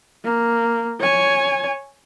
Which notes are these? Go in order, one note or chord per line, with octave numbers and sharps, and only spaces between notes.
A#3
C#5 G#5